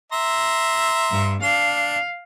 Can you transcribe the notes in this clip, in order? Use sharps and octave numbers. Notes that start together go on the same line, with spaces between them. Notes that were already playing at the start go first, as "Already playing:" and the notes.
E5 A#5 C6
G2
D4 F5